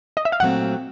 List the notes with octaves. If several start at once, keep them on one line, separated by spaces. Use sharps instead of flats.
D#5
E5
F5
A#2 F#3 A3 C4 F#5